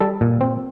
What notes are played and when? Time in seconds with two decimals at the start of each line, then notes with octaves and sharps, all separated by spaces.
0.01 G3 A4
0.21 A#2
0.41 C4